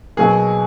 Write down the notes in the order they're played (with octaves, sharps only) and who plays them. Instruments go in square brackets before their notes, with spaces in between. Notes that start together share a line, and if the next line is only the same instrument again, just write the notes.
[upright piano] B2 F#3 A#3 [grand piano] G#4